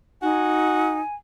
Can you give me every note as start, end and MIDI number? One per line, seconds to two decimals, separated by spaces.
0.22 0.99 63
0.22 0.97 66
0.22 1.15 80